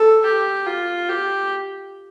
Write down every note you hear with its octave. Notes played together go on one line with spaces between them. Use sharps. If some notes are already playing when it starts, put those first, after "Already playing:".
Already playing: A4
G4
F4
G4